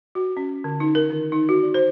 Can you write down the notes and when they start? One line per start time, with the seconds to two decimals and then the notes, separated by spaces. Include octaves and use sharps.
0.15 F#4
0.37 C#4
0.64 D3
0.80 D#4
0.95 A#4
1.10 D#3
1.32 D#4
1.49 F#4
1.63 D5
1.74 C5